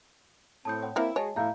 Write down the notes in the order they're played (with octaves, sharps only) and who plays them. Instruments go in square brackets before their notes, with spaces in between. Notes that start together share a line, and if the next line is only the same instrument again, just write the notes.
[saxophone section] A2 C4 [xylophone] A5 D#6 G6
[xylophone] C#5 F#5 G5
[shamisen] A#3 C4 A#4 [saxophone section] E4
[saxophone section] G#3 F#4 G#4 [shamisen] C#5 [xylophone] D#5 G#5 A5
[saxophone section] A2 E4 [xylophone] E5 G6 [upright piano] F5 A#5